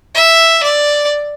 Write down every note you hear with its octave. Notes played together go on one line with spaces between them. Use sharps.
E5
D5